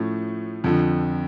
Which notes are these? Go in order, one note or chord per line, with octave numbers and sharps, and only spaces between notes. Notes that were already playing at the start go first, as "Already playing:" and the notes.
Already playing: A2 F3 A3 C#4
F2 D3 F3